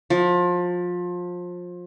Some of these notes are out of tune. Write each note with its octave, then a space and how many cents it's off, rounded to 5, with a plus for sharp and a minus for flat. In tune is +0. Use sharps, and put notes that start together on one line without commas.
F3 +25